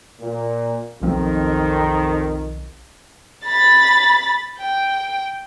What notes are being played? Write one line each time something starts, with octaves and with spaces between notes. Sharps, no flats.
A#2
B1 F2 D#3 F3 C4
B5 A6
G5